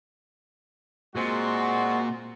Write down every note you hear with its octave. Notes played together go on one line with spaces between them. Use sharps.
A#2 G#3 C4 F#4